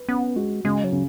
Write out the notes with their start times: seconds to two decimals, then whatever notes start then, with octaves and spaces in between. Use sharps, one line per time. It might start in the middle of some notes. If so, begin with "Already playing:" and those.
Already playing: B4
0.08 B3 C#4
0.36 G#3 F#4
0.65 C#3 G#3
0.84 F#3
0.92 C#3